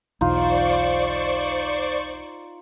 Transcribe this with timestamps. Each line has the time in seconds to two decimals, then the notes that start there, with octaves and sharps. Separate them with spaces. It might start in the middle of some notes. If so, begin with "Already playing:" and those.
0.21 B1 E2 D#4 F4 C5 D5 C#6